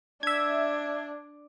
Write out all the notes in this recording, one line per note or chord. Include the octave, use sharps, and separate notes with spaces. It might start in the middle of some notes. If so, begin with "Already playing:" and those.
D4 E5 G#6